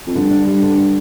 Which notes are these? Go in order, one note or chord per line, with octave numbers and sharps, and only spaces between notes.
F2
G2 D3
D4
G3
D3
D3